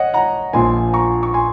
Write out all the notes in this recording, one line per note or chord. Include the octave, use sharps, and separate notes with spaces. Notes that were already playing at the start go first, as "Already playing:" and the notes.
Already playing: C#5 D#5 F#5
F#5 A#5
A#1 A#2 F3 G#5 C6
A#5 C#6
C#6
G#5 C6